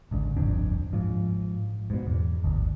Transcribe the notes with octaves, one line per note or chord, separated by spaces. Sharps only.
G#1 C#2 D3
D1 G1 F2 D4
G#2 F3
G#2 B2
E2
G1 D2